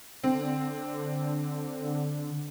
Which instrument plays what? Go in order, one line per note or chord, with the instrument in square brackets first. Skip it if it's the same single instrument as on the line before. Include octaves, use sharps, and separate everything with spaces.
[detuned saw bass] D3 [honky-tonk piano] C4